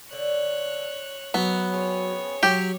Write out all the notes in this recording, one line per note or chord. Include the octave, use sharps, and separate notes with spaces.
D3 C#5 F#6
D#3 F#3 B3
C4 C#4 G#4 C#5
F#3 G4